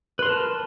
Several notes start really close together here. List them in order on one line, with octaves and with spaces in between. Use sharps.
B4 C6 A#4 A5